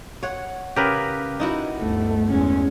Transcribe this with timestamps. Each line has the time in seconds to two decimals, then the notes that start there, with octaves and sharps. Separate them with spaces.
0.23 C#5 F#5
0.76 C#3 G4 A#4 B4
1.40 D#4 E4 F#4
1.79 G1 D2 A3
2.28 E2 G#3 C#4